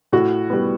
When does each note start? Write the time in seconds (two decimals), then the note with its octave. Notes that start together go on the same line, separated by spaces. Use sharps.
0.12 A2 F#4
0.50 G3 B3